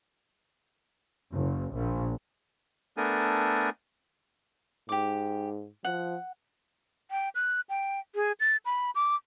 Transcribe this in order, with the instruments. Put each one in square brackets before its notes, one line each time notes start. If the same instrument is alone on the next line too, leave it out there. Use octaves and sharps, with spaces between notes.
[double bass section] F#1
A#1
[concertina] A3 B3 D4 A4 A#4 G#5
[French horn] G#2 [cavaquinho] G4 D6
[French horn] F3 [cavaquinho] F#5
[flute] G5
F#6
G5
G#4
A6
B5
D6